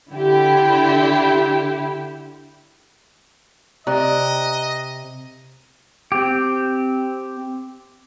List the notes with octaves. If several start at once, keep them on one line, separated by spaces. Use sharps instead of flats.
D3 E4 G4
C3 D5 D#5 A#5 F#6
C4 G4